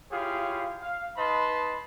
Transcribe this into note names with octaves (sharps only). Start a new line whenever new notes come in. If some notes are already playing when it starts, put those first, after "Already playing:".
E4 F4 G4 G#4 C#5 F5
F5
D#4 B4 D#5 A5 B5 C6